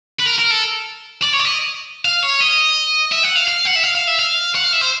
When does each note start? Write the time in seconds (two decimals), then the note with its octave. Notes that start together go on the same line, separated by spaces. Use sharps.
0.19 B4
0.26 A#4
0.39 A#4
0.50 A4
1.23 D5
1.34 C#5
1.40 D5
1.45 D#5
2.05 F5
2.23 C#5
2.40 D#5
3.12 E5
3.24 F#5
3.36 F5
3.48 F5
3.65 F#5
3.76 E5
3.83 F5
3.95 F5
4.07 E5
4.19 F5
4.55 F#5
4.64 F5
4.73 E5
4.81 C5